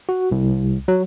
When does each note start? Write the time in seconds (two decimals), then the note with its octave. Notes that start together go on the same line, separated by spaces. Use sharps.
0.09 F#4
0.31 C2
0.88 F#3